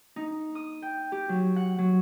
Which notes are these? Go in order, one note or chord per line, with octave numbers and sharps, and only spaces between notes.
D#4
D#6
G5
G4
F#3
F#5
F#3